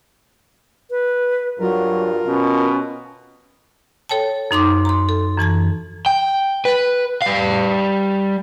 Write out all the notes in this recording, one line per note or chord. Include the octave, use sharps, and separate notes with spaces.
B4
G2 F#3 F4 A#4
B2 C#4
A4 C#5 G5 A5
F#2 D#4 C6 D6
A#5 C6
A4
F#2 E3 A5 G#6
G5
B4
G3 F5